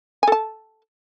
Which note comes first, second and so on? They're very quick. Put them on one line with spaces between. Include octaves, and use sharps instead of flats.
G#5 A4 A5